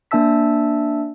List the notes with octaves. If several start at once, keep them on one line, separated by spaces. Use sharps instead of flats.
A#3 D4 E5 A5 E6 B6